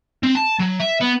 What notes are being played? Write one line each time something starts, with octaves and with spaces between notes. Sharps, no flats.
C4
A5
F#3
E5
B3